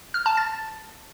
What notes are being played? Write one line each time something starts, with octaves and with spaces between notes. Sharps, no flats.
F6
A5
A6